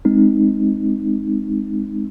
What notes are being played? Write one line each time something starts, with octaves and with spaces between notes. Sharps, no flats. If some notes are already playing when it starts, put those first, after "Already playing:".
G#3 C4 D#4